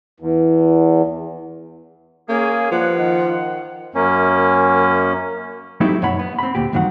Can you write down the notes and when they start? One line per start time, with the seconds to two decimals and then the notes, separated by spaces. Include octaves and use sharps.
0.20 E2
2.29 A#3 C#4 G#4
2.72 G2 F3 F#5
2.98 D#3 F#5
3.95 F#2 A#3 C#4
5.80 F#3 A3 C4 D#4 E4 G4
6.02 F#2 B2 C#5 F#5 B5
6.19 B3
6.39 C4 B5
6.55 D2 A#2 G4
6.73 E2 G2 D#3 F#3 C4 F#5